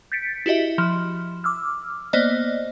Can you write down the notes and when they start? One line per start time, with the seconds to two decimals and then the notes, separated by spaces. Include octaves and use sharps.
0.12 G6 A6 B6 C#7 D7
0.46 E4 F#4 G4 D#5 E5
0.78 F3
1.44 D6 E6 F6
2.13 A#3 B3 C5 D5 D#5